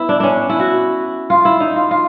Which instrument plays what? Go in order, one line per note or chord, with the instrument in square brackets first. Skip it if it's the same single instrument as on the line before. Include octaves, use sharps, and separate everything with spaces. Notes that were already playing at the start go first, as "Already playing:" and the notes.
Already playing: [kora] B3 E4
D4
C#4 D4
E4
F#4
F4
E4
D#4
F4
F4